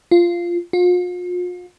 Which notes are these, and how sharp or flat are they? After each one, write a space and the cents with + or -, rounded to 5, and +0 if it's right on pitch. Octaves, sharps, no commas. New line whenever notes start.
F4 -10
F4 +40